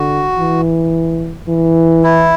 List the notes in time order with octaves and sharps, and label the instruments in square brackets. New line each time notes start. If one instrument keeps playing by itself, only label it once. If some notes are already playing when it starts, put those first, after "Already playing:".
Already playing: [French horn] D3 [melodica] F#4
[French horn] E3
E3
[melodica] E4